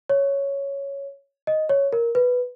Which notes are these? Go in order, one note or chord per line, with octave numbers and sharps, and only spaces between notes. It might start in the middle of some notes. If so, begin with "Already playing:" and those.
C#5
D#5
C#5
A#4
B4